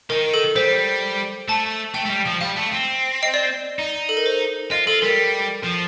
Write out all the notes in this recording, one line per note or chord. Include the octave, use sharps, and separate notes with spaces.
D#3 A#4
A4
G3 C5
A3 A5
A3 G5
A3
G3
F3
G3 F5
A3
C4
D#5
D5
D#4
A4
A#4
C5
F4 D#5
F4 A4
G3 A#4
F3